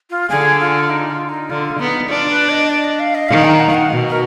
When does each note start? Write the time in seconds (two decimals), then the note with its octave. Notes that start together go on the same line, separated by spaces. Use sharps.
0.10 F4
0.30 D3 G#4
0.60 F4
0.90 D#4
1.10 F4
1.29 D#4
1.50 D3 F4
1.79 B3 D#4
2.09 D4 F4
2.30 B4
2.49 D#5
2.69 D5
2.84 D#5
2.99 F5
3.15 D#5
3.29 D#3 F5
3.44 A#5
3.60 F#5
3.67 F5
3.74 F#5
3.89 B2
4.10 A#4